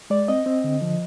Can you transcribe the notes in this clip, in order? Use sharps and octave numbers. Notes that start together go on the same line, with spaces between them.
G#3 D5
C4 D#5
C4
D3
F3